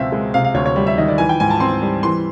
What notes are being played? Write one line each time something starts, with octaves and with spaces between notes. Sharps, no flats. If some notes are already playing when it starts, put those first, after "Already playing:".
Already playing: C#2 B2 C4 E5 F5
G#3
C3 F5
F5
D2 C#5
C#5
G3
E5
D#3 D#5
D5
E3 G#5
G5
G#2 G#5
A5
C4 C6
G3
E3 C6